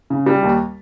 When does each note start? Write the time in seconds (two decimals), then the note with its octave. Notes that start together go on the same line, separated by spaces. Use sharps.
0.10 C#3
0.26 G3
0.42 D#2